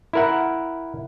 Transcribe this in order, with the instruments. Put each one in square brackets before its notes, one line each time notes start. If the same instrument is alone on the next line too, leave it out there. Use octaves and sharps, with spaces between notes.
[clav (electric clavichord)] E4 A#4 F#5